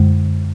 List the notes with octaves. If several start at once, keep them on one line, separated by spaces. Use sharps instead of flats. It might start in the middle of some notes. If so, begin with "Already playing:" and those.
Already playing: F#2 D3 G#3